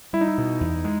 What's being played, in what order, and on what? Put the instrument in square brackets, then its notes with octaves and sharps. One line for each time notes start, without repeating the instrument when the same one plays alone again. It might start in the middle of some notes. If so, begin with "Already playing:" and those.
[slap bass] G3 [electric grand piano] E4
[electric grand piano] D#4
E4
[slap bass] B2
E2
G#3